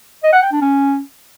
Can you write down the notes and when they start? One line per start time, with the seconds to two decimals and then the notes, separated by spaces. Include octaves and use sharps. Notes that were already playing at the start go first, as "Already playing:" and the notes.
0.23 D#5
0.33 F#5
0.42 G5
0.52 D4
0.61 C#4